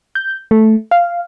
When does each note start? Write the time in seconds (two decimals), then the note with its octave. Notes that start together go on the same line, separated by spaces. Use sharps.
0.15 G6
0.51 A3
0.91 F5